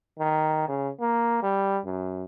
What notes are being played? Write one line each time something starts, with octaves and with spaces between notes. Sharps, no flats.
D#3
C#3
A#3
G3
F#2